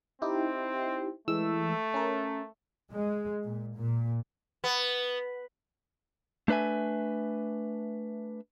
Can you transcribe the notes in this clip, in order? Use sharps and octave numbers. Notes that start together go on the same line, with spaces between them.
C4 D#4 E4 G4
E3 G#3 A3 E6
C#4 A#4
G#3
A#2
A#2
B3
A3 D4 B4 E5 G#5